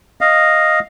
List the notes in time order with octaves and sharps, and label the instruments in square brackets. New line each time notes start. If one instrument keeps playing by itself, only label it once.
[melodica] D#5 F5